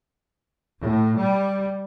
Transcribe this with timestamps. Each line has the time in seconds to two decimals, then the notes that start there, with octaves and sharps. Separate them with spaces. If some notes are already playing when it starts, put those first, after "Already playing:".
0.80 A2
1.19 G3